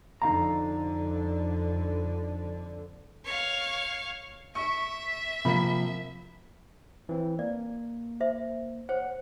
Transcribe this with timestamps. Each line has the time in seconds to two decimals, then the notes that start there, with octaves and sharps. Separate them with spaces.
0.22 F2 D3 D#4 F5 A#5
3.25 C#5 F5
4.55 E5 C#6
5.45 C3 F3 A#3 B5 B6
7.09 E3 C4
7.39 A#3 D5
8.20 C5 E5
8.89 C5 C#5 F#5